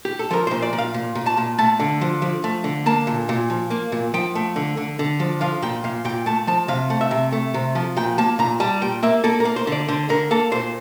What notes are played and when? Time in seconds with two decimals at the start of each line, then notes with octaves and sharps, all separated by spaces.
0.05 G4
0.19 A4
0.31 F3 A#4
0.47 A#2 C5
0.62 D5
0.73 A#2
0.78 F5
0.94 A#2
1.15 A#2
1.26 A5
1.37 A#2
1.58 A3 A5
1.80 D3
2.01 F3
2.22 F3
2.44 A3
2.64 D3
2.86 A#3 A5
3.07 A#2
3.29 A#2
3.50 F3
3.70 A#3
3.92 A#2
4.14 F3 G5
4.35 A3
4.56 D3
4.77 D3
4.99 D3
5.20 F3
5.41 F3 F5
5.62 A#2 G5
5.84 A#2 F5
6.05 A#2 G5
6.26 A3 A5
6.47 F3 A5
6.68 C3 F5
6.90 A3
7.01 E5
7.11 C3
7.32 A3
7.54 C3
7.75 F3
7.97 A#2 G5
8.18 A#3 A5
8.39 A#2 A#5
8.60 G3 A5
8.82 A#2 G5
9.03 A#3 E5
9.24 A#3 A4
9.40 A#4
9.45 A#3
9.56 C5
9.67 D3
9.72 D5
9.88 D3 C5
10.09 D3 A#4
10.31 A#3 A4
10.52 A#2 C5